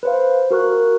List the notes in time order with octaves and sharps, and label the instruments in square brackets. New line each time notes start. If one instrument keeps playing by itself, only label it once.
[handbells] B4 C5 F5
F#4 A#4 C#6 F#6